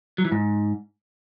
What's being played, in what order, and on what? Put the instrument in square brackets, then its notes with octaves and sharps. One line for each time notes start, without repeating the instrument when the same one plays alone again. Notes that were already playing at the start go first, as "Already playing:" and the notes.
[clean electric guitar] F#3
E3
G#2